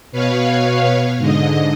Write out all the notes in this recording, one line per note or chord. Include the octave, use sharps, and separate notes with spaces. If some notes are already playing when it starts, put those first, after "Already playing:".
B2 B4 C#5 F5
G#2 D3 D#5